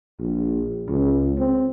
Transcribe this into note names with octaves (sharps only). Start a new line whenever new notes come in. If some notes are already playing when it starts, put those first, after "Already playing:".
A#1
C#2
C4